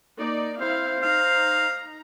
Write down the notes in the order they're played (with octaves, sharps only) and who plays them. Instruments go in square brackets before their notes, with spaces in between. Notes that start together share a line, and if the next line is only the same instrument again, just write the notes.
[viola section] A#3 D#4 D5
[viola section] C4 E4 F5 [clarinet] C5
[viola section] D#4 A#5 [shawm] F5